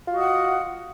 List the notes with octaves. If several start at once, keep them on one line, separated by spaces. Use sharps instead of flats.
F4 F#4 D#5 F#5